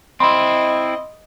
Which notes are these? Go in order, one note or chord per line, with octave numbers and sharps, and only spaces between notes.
C4 E4 D#5 B5 C6